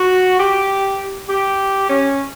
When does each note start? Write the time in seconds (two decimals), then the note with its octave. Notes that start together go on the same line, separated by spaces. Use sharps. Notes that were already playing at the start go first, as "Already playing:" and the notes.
Already playing: F#4
0.39 G4
1.28 G4
1.89 C#4